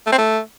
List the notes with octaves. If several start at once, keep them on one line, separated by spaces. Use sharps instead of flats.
A3
C4
A3